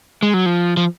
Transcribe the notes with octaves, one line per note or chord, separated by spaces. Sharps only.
G#3
F#3
F3
F3